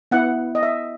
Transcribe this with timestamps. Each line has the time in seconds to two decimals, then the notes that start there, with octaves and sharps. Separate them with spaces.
0.11 B3 E4 F#5
0.55 D#5
0.63 E5